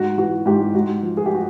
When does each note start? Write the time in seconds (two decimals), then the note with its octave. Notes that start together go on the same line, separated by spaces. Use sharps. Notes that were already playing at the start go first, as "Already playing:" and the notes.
Already playing: G#2 F#4
0.18 E3 F#4
0.46 G#2 G4
0.74 G#2 F#4
1.03 F3
1.17 G#4
1.26 G4
1.35 F#4